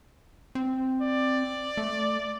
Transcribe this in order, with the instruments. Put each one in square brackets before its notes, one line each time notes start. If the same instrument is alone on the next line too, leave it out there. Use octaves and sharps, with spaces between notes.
[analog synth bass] C4
[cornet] D5
[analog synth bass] A3